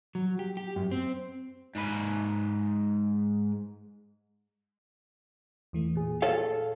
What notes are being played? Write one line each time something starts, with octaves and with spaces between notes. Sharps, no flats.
F#3
G4
G4
F#2
C4
G#2 B4
E2 E3 A3
A#2 G#4
A4 C#5 F5